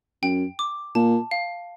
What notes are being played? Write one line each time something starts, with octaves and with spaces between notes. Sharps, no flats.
F#2 G5
D6
A#2 A5
F5